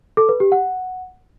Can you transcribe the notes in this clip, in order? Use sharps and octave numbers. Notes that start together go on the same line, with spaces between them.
A4
B4
G4
F#5